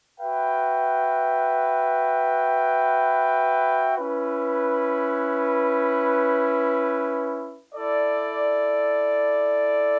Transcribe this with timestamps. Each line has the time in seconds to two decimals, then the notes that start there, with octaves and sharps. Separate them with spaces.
0.20 F#4 B4 E5 G5
3.98 C#4 E4 B4
7.75 E4 A4 D5